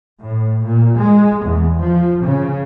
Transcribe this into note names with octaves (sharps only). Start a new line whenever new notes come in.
A2
A#2
G#3
E2
F3
C#3